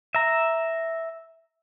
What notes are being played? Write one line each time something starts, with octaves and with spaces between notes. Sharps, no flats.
E5 A#5